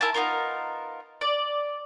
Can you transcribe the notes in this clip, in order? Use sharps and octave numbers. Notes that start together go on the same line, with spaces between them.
E4 A#4 G#5 A5
B3 D#4 F4 A#4
D5